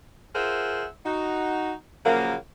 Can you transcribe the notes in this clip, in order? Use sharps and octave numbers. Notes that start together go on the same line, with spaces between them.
F4 G#4 A#4 C5 E5 F#5
D#4 F#4
A#2 C#3 F3 F#3 A#3